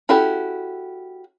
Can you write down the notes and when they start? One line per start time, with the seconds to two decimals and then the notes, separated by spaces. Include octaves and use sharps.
0.09 C#4 E4 F#4 G4 A4